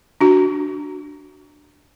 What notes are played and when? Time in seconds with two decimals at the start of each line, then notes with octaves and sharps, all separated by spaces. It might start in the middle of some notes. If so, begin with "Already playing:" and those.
0.21 D4 F#4